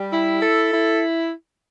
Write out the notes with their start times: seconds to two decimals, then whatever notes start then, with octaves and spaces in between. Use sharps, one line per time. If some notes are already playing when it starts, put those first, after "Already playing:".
Already playing: G3
0.13 E4
0.42 A4
0.73 E4